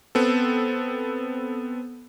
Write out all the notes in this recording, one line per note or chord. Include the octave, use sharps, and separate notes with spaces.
B3 C4 A4